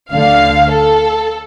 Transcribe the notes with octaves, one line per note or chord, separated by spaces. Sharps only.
D2 D3 F5
A4